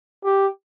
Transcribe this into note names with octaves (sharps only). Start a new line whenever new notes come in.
G4